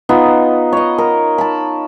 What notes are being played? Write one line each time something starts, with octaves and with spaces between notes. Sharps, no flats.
B3 D#4 F4
C#5 D#5
A#4
A5 B5